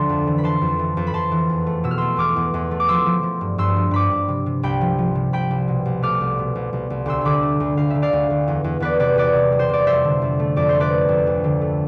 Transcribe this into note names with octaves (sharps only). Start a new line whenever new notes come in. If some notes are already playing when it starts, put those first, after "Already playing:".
Already playing: D2 D3 F3 A5 C6
F2
E3
B5
E3 A5 C6
F2
E3
F2
B5
F2 A5 C6
E3
E2
A3
B2 E6
F6
A3 C6 E6
E2 D6 F6
E2
E2
A3
D6
F3 C6 E6
F3
F3
G2
G2 C6 E6
F3
G2 B5 D6
G2
C3
C3
C2 G5 B5
F3
F3
C3
C2 G5 B5
C2
B2
C2
A3 D6 F6
C2
B2
C2
C2
C2
D2 C6 E6
D3 B5 D6 E6
A3
D2
D2 F5
D3 E5
D5 F5
D2
D2
E2
E2
E2 B4 D5
C3 B4 D5
E2 B4 D5
C3
G3
C5
C3 D5
F2 C5 E5
D3
F2
A3
F2 D5
C5
A3
B4 D5
A3
F2
D2
D3
A3